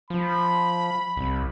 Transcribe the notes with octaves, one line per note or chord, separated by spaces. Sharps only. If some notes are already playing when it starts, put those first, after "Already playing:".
F3 B5
C2